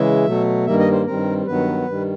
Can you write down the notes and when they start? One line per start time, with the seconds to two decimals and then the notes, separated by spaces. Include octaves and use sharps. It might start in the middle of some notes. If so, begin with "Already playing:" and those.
Already playing: C#3 E3 G#3 E5
0.26 B2 F#3 A3
0.66 G2 D#3 G3 A#3 E5
0.79 D#5
0.92 C5
1.06 G2 D#3 G3 C4 A#4
1.46 G2 D#3 F#3 B3 B4
1.86 G2 D#3 G3